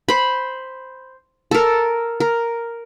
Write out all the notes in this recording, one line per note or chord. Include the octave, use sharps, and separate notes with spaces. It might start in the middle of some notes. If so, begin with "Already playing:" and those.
C5 B5
A4 A#4
A#4